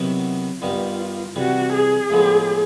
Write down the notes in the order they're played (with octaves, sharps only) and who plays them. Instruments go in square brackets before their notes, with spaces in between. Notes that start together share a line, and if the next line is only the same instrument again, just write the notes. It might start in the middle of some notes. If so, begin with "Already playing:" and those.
Already playing: [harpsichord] C3 D#3 F#3 B3 E4
[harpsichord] G2 D#3 G3 B3 [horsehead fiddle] F4
[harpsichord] C3 E3 G3 [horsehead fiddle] F#4
[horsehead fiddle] G#4
[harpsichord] A2 F3 G#3 B3